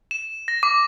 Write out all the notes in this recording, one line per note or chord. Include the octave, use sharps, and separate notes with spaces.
E7
A#6
D6